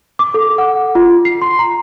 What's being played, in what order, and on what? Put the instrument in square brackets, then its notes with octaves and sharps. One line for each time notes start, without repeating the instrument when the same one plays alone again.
[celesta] D6
A4
F#5
F4
C7
C6
A#5